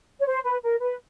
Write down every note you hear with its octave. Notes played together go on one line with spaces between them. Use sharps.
C#5
C5
B4
A#4
B4